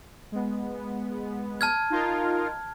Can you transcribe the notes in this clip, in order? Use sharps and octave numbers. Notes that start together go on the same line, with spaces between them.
G#3 B3
A5 F6 G#6
D#4 F4 A#4